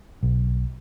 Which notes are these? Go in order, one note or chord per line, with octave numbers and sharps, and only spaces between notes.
B1